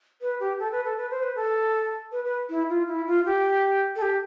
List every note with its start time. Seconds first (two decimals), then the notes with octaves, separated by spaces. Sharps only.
0.21 B4
0.40 G4
0.59 A4
0.72 B4
0.84 A4
0.97 B4
1.10 C5
1.23 B4
1.35 A4
2.12 B4
2.25 B4
2.50 E4
2.69 F4
2.88 E4
3.07 F4
3.26 G4
3.96 A4
4.02 G4